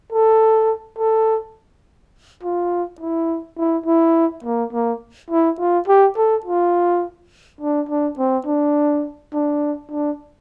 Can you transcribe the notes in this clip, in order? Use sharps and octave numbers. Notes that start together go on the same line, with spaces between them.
A4
A4
F4
E4
E4
E4
A#3
A#3
E4
F4
G4
A4
F4
D4
D4
C4
D4
D4
D4